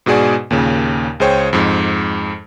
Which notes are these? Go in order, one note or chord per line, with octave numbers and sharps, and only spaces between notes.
G#2 B2 F#4 G#4 D5 G#5
D#2 A#2 C#3
C#2 G#4 C5 C#5 G5
F2 G#2